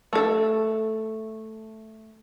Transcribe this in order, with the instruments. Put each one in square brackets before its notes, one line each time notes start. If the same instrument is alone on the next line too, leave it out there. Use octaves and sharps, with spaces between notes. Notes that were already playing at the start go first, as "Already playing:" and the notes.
[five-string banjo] A3 A4